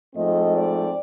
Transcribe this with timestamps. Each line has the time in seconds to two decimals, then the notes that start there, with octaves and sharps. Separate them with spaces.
0.15 G#2 F3 A3 C4 D#5
0.55 D5